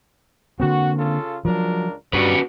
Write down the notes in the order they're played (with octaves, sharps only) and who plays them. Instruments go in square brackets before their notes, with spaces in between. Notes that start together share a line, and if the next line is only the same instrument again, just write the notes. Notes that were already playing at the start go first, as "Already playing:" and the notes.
[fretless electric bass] D3 A#3 C4 [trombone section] F#4
[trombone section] C#3 F4 A4
[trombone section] C#2 D4 A#4 [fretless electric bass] F3 F#3
[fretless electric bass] G2 [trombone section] F#3 G3 [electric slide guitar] C#4 F#4 B4